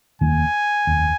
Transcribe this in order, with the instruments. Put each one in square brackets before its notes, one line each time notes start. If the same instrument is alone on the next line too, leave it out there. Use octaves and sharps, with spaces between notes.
[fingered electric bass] F1 D#2 D#3 A#3 [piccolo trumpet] G#5
[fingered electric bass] F1 D#2 D#3